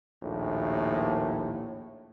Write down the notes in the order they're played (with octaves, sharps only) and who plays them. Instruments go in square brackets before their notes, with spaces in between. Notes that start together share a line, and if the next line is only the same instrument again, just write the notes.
[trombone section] A#1 D#2 A2